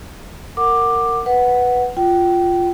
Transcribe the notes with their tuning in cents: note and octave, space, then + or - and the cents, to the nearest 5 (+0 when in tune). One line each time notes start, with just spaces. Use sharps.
A#4 -20 F#5 +0 D6 +10
B4 +0 F#5 +0
F4 +0 G5 -25